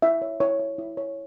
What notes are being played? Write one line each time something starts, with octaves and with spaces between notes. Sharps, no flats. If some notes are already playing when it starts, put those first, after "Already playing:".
E4 E5
C#5
E4 C#5
C#5
E4
C#5